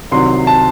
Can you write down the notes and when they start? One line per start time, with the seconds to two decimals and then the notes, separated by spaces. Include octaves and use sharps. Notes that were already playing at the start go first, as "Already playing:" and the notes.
0.11 C2 C3 D#3 F#3 C6
0.47 A5